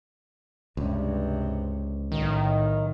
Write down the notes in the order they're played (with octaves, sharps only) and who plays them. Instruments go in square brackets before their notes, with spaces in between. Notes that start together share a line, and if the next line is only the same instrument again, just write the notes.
[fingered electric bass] C#2 [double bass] G2 C3
[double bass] B1 A2 [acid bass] D#3